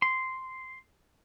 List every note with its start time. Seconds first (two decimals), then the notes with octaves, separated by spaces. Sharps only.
0.02 C6